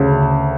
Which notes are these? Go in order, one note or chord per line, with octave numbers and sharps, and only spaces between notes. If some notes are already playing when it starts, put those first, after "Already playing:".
Already playing: D2 C#3